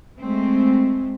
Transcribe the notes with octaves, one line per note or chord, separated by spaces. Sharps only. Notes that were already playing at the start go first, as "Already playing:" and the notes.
G#3 A3 C4